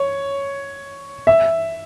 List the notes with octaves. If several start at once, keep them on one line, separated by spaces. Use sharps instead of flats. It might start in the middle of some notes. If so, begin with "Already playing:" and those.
Already playing: C#5
E5